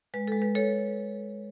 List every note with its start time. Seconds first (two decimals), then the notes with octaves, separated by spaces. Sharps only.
0.14 G#3 B4
0.28 A4
0.32 G#3
0.42 B4
0.55 A4 C#5